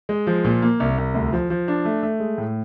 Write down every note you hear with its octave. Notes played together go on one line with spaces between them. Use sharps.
G#3
F3
A#2
A#3
C2
C2
D2
F3
F3
D4
A3
A3
G#3
A2